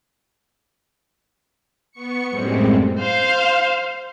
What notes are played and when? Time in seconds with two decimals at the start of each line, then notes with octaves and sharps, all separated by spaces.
1.92 B3 C#6 C#7
2.30 F#2 A2 G3 G#3 C4
2.99 C5 F5